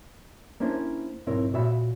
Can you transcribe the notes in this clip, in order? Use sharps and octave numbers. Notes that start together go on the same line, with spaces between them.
A#3 C#4 D4 E4 C5
B1 G#2 C4 E4 A#4 C#5
A#2 F#4 C#5 E5 F5 B5